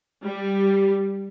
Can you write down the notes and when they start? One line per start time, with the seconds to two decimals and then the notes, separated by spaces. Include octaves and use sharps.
0.24 G3